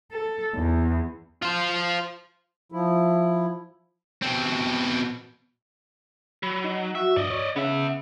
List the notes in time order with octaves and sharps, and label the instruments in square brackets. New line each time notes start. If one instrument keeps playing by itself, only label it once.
[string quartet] A4
E2
[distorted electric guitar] F4 C5
[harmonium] F3 E4
[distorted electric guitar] B2 C4
[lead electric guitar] F#3 [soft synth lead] B5
[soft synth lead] D#4
[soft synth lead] F#4 [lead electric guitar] E5
[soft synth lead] G2 [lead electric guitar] D5 D#5
[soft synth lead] C#5
[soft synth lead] C#3 [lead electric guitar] B3 E5